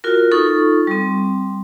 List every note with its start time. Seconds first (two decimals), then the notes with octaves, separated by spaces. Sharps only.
0.04 F4 F#4 A#4
0.31 D#4 F4 A4 C#6
0.87 G3 C4